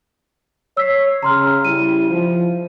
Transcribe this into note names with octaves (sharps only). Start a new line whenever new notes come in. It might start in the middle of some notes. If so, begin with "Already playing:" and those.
C#5 E6 B6 C7
C#3 A#5 C6 F6
C#3 G3 E4 D#7
F3